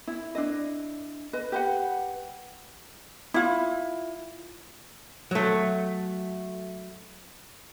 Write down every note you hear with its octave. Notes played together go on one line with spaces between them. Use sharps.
E4
D4 E4 D#5
B4 D#5
G4 B4 F#5
E4 F4
F#3 A3